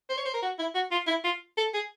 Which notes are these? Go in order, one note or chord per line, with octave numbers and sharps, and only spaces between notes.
C5
C#5
C5
A#4
F#4
E4
F#4
F4
E4
F4
A4
G#4